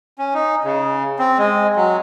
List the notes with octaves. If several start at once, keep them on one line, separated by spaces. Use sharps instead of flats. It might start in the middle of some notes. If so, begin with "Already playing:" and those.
C#4
D#4
C#3
C4
G#3
F#3